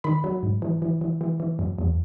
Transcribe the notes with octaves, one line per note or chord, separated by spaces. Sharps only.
D#3 B5
F#3
G#2
E3
E3
E3
E3
E3
F#2
E2